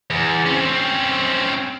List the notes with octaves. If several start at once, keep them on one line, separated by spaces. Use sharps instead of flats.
E2
C4 C#4